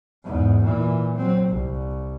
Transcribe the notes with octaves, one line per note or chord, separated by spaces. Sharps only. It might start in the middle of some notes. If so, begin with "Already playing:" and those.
E2 G#2
A#2 E3
F#3 C4
C2